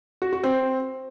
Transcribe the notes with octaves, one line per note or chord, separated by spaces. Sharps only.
F#4
F#4
C4